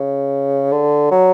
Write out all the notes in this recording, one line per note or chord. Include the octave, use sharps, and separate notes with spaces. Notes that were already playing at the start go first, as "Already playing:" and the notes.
Already playing: C#3
D3
F#3